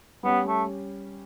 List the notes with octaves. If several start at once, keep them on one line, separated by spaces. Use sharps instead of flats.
G3 B3 C#4 G4
A3